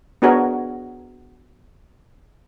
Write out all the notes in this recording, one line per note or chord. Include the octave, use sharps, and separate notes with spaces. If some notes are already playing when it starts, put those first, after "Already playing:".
B3 D4 F#4 G#4 A#4 C#5